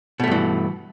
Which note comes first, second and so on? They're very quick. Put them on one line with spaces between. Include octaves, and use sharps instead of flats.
B2 A3 G2 E3